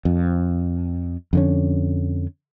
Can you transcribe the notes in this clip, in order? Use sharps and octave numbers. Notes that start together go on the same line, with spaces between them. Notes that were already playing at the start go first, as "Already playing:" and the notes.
F2
F2 D3 C#4